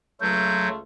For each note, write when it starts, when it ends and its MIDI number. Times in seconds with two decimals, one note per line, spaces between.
0.21 0.77 37
0.21 0.69 54
0.21 0.77 57
0.21 0.77 65
0.21 0.67 91